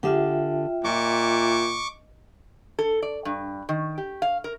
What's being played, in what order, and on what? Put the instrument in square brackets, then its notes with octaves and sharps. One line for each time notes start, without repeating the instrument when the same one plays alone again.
[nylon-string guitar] D3 G4 G#4 [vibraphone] F4 E5 G5
[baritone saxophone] A#2 [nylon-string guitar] D#5 [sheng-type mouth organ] C#6 D6
[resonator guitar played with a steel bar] A4
D5
G2
D#3
G4
F5
A#4